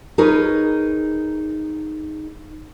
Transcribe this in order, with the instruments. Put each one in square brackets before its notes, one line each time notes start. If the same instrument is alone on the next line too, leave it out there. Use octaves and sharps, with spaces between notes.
[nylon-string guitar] D#4 G#4 A#4 B4 C#5